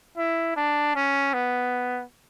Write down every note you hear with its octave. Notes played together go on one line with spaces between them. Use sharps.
E4
D4
C#4
B3